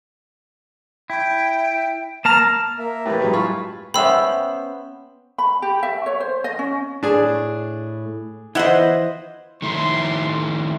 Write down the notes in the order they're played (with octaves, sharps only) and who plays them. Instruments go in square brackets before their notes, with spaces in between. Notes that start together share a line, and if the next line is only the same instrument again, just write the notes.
[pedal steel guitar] E4 [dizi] G5
[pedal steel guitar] A#3 A5 A#5 [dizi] F6
[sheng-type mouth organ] A#3 A#4 E5
[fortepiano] A2 E3 [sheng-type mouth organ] E4 G4 B4
[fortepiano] G2 F#3 G#3
[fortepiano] F4 B5 C#6 [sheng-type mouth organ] F5 G#5 A5
[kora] B3 C#4 C5 [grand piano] E5 G5 [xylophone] B5 E6
[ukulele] B5
G4
E5
C#5
C5
D#5
C#4
[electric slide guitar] A2 [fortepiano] D4 G#4
[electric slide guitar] E3 F4 [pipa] E4 F#5 [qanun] C5 D#5 E5
[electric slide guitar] D#3 A3 E4 [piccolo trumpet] C6